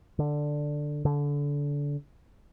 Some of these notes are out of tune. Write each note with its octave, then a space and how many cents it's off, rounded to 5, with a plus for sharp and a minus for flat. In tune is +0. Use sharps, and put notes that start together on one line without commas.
D3 +5
D3 -25